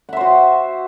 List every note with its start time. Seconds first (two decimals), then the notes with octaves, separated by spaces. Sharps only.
0.09 F#5
0.13 E5
0.17 C5
0.21 F#4